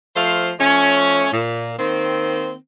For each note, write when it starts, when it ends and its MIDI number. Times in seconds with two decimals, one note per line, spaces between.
0.15 0.52 53
0.15 0.52 57
0.15 0.52 72
0.15 0.52 77
0.60 1.28 53
0.60 1.28 57
0.60 1.28 61
1.32 1.72 46
1.78 2.54 51
1.78 2.54 58
1.78 2.54 60